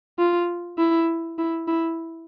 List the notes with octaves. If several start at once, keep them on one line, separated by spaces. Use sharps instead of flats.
F4
E4
E4
E4